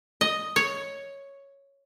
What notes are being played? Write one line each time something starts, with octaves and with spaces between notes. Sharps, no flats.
D#5
C#5